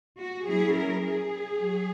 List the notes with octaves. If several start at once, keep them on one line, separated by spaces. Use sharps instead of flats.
F#4
F#3 C#4 E4 G#4
A#4
G#4
F#3